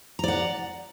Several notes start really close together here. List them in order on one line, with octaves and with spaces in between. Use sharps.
A#5 D5 F#5